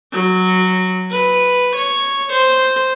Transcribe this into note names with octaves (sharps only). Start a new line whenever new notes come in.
F#3
B4
C#5
C5